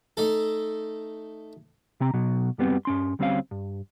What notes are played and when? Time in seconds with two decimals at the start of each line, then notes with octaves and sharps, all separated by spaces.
0.17 A3 D#4 A4
2.00 C3 C4 A#5
2.14 B1 B2 F#3
2.58 F#2 G3 B3 C4
2.85 G2 C#4 C6
3.19 D2 G3 C4 C#4 G4 F5
3.51 G2